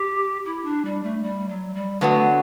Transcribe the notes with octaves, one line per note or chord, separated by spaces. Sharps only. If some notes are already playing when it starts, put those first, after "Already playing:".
Already playing: G4
E4
D4
G3
A3
G3
F#3
G3
D3 F#3 A3 B3 D4 F#4